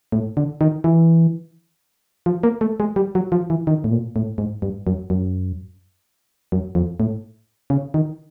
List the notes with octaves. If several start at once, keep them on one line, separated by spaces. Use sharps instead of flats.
A2
D3
D#3
E3
F3
A#3
A3
G#3
G3
F#3
F3
E3
D#3
A2
A#2
A2
G#2
G2
F#2
F#2
F#2
F2
A2
C#3
D#3